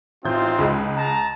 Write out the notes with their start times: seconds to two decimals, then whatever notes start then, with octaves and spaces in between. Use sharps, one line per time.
0.24 A1 C4 D#4 F4 G6
0.59 C#2 G#3
0.96 A5 A#5